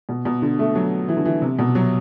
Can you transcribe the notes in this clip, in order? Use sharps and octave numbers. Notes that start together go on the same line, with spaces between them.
B2
B2
D3
A3
F#3
E3
D3
E3
C3
B2
F#3